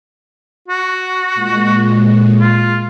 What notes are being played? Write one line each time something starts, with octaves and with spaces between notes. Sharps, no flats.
F#4
A#2 G#3
F4